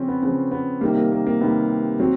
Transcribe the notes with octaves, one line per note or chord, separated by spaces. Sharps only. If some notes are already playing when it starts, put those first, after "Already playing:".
Already playing: C#3 F3 C4 C#4
B3
C#3 F3 B3
B3
C3 D#3 G3 A#3
A#3
A#3
A#3
C3 D#3 G3 B3
F#3 C4